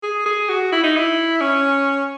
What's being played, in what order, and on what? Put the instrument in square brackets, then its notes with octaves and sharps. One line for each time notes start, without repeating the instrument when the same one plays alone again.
[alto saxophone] G#4
G#4
F#4
E4
D#4
E4
C#4